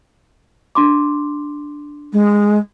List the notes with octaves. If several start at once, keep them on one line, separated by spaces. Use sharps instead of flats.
D4 C6 D6
G#3